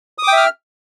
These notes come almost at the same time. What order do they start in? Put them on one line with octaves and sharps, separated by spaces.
D#6 D6 G5 E5 F6